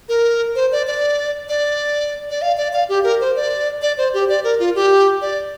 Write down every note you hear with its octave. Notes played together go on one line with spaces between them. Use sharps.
A#4
C5
D5
D5
D5
D5
F5
D5
F5
G4
A#4
C5
D5
D5
C5
G4
D5
A#4
F4
G4
D5